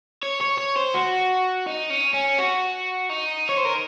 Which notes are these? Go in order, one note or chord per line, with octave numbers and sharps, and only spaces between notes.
C#5
C#5
C#5
C5
F#4
D#4
C#4
C#4
F#4
D#4
C#5
C5
A#4